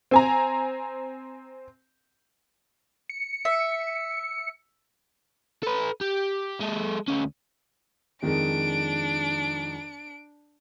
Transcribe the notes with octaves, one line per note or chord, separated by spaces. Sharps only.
C4 G#5 A#5
C#7
E5
A4 B4
G4
G#3 A4
D2 C#4
F2 D#3 G#3 D4 D7